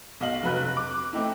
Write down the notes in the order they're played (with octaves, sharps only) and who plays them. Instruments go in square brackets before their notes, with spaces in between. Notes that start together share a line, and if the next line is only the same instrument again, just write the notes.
[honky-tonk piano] B1 D#5 F5 F#7
F1 F#3 B4 F#6
D6
A3 C4 D#4 E4